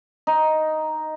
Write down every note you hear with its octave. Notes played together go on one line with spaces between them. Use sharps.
D#4